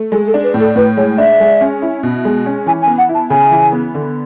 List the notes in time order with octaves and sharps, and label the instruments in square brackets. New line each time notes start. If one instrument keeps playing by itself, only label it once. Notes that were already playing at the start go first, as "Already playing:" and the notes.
Already playing: [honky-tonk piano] A3
[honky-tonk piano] G#3 [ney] A4
[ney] A4
[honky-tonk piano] D4
[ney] B4
[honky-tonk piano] A2
[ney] A4
[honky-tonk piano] A2 [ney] B4
[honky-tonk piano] G#3 [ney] C#5
[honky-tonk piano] D4 [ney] E5
[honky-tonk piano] G#3
C#4
E4
B2
G#3
C#4
[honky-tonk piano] E3 [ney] G#5
[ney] G#5
[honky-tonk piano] B3
[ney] F#5
[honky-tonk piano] E4
[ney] A5
[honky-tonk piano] C#3 [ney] G#5
[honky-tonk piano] E3
B3
D3